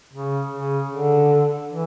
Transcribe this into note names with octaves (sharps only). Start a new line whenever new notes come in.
C#3
C#3
D3
E3